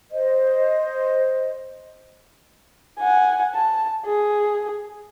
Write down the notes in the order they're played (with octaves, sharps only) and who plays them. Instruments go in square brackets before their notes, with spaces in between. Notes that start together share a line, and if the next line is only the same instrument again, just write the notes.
[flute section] C5 D#5
[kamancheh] F#5 G#5
A5
G#4